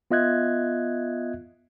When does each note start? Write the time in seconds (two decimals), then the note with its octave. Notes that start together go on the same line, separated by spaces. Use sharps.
0.11 B3 F4 D#5 E5 F#6 G#6